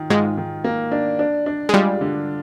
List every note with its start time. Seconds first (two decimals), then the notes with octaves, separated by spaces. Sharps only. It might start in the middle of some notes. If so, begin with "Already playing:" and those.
Already playing: D#3 F4
0.10 G#2 G#3 F4
0.37 D#3
0.64 A#3
0.92 D4
1.19 D4
1.46 D4
1.69 G#3
1.73 G3 F4
2.01 D3